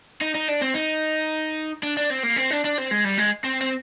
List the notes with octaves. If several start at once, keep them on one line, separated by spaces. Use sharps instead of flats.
D#4
D#4
D4
C4
D#4
D4
D4
C4
A#3
C4
D4
D4
C4
G#3
G3
G#3
C4
C4